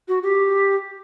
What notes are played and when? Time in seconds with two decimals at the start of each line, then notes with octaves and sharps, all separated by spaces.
0.08 F#4
0.23 G4